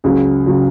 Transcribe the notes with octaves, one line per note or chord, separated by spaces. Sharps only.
C#2 C#3 F#3 G#4
C#3 F#3